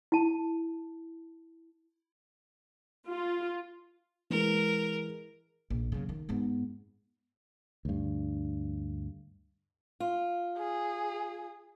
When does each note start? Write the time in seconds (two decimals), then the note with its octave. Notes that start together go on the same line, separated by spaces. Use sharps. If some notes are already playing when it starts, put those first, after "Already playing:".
0.12 E4 A5
3.08 F4
4.30 E3 G#3 A#4
5.70 A#1
5.92 C#3 F#3
6.09 D#3
6.29 G#2 B3
7.85 D2 G2
10.00 F4
10.58 G#4